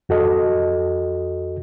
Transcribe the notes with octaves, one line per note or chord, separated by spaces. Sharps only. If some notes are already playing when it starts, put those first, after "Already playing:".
F2 F#4 A4 D#5